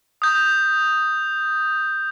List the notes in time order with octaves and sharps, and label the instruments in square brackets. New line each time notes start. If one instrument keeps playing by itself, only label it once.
[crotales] D#6 G6